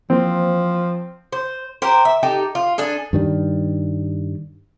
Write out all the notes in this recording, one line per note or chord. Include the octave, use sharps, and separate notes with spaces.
E3 F3 A#3 C4
C5
G4 A#4 C5
E5
D#4 G4 A4
F4
D4 G#4 A4
G2 D#3 G3